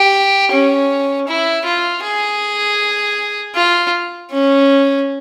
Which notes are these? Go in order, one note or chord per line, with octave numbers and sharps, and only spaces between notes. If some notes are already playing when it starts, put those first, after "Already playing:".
Already playing: G4
C#4
E4
F4
G#4
F4
C#4